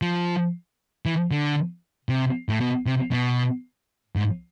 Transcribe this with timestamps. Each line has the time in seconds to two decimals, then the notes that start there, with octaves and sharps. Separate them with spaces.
0.02 F3
1.06 E3
1.31 D3
2.09 C3
2.49 A2
2.61 B2
2.86 C3
3.11 B2
4.16 G#2